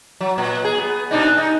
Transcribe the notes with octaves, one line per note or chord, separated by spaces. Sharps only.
F#3
A#2
G#4
B3
B2 D4 D#4
D#4